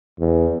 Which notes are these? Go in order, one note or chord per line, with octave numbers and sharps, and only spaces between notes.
E2